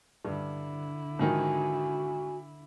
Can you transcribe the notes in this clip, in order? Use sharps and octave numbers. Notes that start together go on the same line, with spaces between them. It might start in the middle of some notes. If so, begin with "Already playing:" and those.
G2 D3 E4
G#2 D#3 F3 F#4 G#5